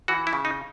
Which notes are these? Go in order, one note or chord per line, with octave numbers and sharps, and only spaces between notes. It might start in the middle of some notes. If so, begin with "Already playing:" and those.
E3 F#4
E4
C#3
D#4